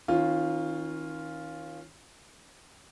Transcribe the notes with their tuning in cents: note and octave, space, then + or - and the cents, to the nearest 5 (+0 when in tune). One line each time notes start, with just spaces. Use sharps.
D#3 +35 C#4 -15 F4 +0